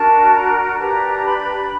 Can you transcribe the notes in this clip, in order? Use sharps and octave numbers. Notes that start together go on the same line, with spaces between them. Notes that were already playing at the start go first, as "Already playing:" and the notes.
Already playing: D4 F#4 A#4 A5
A#5
D4 G4 B4 A#5
B5